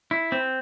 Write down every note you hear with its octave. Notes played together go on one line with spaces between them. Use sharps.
E4
C4